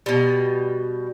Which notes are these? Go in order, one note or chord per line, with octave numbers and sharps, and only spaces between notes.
B2 G3